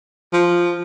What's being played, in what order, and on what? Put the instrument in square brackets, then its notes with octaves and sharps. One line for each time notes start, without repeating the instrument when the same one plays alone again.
[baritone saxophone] F3